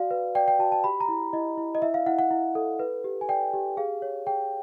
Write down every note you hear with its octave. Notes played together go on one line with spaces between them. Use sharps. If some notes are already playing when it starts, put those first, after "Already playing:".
Already playing: F#4 D5 F5
B4
D5 G5
G5
F#4 A5
A5
G4 B5
A#5
E4
E4 D#5
E4
D#5
E4 E5
F5
E4 F#5
F#5
E4
A4
B4
G4
G#5
D5 G5
G4
G#4 F5
C#5
G#4 G5